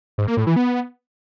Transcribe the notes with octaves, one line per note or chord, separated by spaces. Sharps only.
G#2
A#3
A2
E3
B3